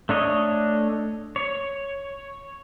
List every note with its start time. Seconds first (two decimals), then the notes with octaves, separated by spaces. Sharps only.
0.09 A3 D4 C#5 D#5
1.36 C#5